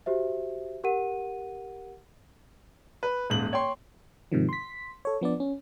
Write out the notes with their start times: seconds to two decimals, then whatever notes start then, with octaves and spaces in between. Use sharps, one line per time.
0.06 F#4 G4 C5 E5
0.84 G4 A#4 F#5 D#7
3.03 B4
3.30 D#1 G#2 F#7
3.53 C#5 G5 C6
4.32 G#2 C3 D#3 F3
4.49 C6 B6
5.05 A4 C#5
5.21 F3 B3 D4 D5
5.40 C#4